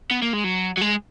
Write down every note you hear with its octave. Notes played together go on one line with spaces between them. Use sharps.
B3
A#3
G#3
F#3
F#3
G#3